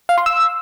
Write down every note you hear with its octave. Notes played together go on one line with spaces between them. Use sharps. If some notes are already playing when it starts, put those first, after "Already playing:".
F5
C6
E6